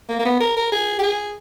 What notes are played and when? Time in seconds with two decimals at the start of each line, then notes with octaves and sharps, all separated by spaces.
0.09 A#3
0.19 A#3
0.25 B3
0.41 A#4
0.57 A#4
0.72 G#4
0.99 G4
1.03 G#4